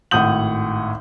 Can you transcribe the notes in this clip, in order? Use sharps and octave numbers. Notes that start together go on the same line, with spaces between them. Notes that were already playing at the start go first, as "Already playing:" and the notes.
G#1 A2 F#5 D#6 G6 F#7